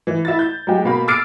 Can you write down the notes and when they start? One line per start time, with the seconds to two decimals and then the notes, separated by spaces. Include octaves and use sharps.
0.07 E3
0.25 E4 A6
0.39 G6
0.67 F#3 G#3 G4
0.84 B2 A#3 B5
1.08 D6 E6 F6 A6 C7 D7